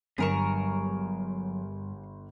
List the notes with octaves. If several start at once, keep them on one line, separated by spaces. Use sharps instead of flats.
G1 G2 F#3 G#4 A#4 C#6 E7